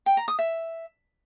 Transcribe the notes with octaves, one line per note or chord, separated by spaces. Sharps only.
G5
A#5
D#6
E5